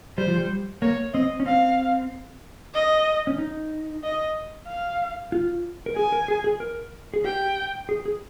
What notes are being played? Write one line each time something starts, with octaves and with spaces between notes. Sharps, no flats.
G3 C5
F3
G3
A#3 C#5
C4 D#5
C#4
C4 F5
D#5
C#4
D#4
D#5
F5
F4
A#4
G#4 G#5
A#4
G#4
G#4
A#4
G#4
G4 G5
G#4
G#4